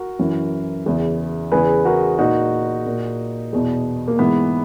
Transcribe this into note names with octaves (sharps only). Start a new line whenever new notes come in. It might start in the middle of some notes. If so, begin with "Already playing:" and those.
Already playing: F#4 A#4
F#2 E3
E2 C#3 E3
E2 C#3 E3 G#4 B4
F#4 A#4
A#2 D#4 F#4
A#2
E2 B2
A#3
G#2 E3 B3